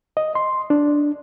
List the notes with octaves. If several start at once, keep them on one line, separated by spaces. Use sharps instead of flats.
D#5
C6
D4